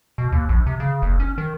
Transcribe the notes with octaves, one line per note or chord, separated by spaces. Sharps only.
B2
D#2
A#1
C3
C#3
F#1
C#4
D#3